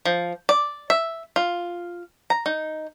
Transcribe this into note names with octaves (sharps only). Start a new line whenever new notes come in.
F3
D5
E5
F4
A#5
D#4